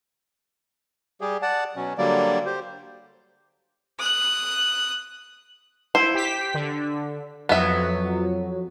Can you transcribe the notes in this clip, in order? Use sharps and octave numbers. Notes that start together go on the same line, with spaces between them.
G3 G4 G#4
D5 F#5 A5
B2 F#3 C#4
D3 F#3 G3 A#3 D5
G4 C5
D#6 F#6
E4 C5
G4 B6
D3
F2 F#3 B3 E5